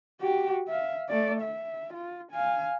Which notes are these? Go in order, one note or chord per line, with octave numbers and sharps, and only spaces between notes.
F#4 G4
E5 F5
A3 D5
E5
F4
F5 G#5